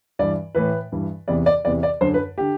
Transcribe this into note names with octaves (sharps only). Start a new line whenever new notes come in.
G2 E3 D5
A2 E3 B4
G2 E3
E2 C3 E3 D5
D5
E2 C3 E3 D5
D5
F#2 D3 C5
B4
D3 G4